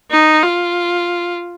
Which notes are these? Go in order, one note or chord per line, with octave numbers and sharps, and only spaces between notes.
D#4
F4